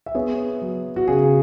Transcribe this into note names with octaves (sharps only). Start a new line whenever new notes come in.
E5
B3 G#4 C#5
F#3
F#4
C#3 G#4